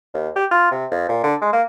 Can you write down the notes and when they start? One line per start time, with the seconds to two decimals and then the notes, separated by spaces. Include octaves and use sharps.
0.14 D#2
0.36 G4
0.51 F4
0.71 C3
0.91 F2
1.09 A#2
1.24 D3
1.42 G#3
1.53 A#3